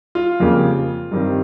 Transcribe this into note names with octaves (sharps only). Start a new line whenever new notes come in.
F4
F2 C#3 G3 A#3
G2 D#3 G3 C4